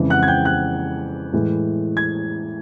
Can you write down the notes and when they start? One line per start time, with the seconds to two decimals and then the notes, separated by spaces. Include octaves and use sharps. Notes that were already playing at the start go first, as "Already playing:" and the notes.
Already playing: F2 C#3 E3 G#3
0.10 F#5 F#6
0.23 G#6
0.28 G5 G6
0.45 F#5 F#6
1.33 A2 E3 G#3
1.97 G#6